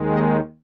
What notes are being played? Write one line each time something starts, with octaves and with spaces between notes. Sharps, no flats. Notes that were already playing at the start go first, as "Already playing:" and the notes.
Already playing: D#2 D#3 G#3
D#5